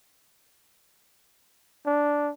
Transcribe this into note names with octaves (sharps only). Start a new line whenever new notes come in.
D4